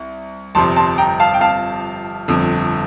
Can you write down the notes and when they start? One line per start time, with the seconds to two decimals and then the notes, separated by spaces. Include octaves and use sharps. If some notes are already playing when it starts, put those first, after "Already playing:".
Already playing: C2
0.55 G1 F2 C3 G3 A5 C6
0.76 A5 C6
0.98 G5 A#5
1.20 F5 A5
1.34 G5
1.41 F5 A5
2.28 G1 F2 D3